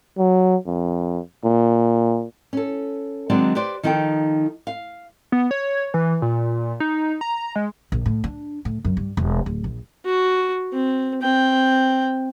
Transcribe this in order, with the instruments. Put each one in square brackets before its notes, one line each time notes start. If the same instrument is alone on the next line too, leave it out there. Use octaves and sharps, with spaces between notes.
[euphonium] F#3
F2
A#2
[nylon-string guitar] C#4 A4
D#3 F#3 G#3 C4 D4 D5
G4 B4 C5 D5
D#3 F3 D#4 A4 G5
F5
[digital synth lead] B3
C#5
E3
A#2
D#4
A#5
G#3
[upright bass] A#1
A2
D4
A2
F#2
G2
E1
D1
A#1
[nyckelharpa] F#4
C4
C4 G5